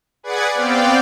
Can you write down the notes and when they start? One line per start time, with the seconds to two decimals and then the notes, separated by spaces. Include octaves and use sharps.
0.23 G#4 B4 D5 F#5 G#6
0.55 B3 C4 D5 F5 G5